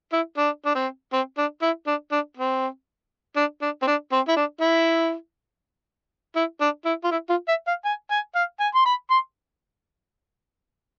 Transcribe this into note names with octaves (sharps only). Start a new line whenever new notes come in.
E4
D4
D4
C4
C4
D4
E4
D4
D4
C4
D4
D4
C4
D4
C4
E4
D4
E4
E4
D4
E4
F4
E4
F4
E5
F5
G#5
G#5
F5
G#5
C6
B5
C6